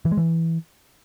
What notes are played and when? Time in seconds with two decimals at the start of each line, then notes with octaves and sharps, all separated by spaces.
0.05 E3
0.11 G#3
0.18 E3